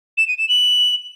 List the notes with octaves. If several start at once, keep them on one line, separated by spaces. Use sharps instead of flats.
E7
D#7
E7
F#7